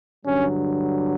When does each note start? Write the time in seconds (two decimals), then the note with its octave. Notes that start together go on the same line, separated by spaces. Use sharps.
0.25 G2 D3 F#3 C#4